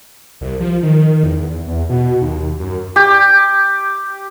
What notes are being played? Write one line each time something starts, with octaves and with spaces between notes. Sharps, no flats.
C2
F3
D#3
E2
E2
B2
D#2
F#2
G4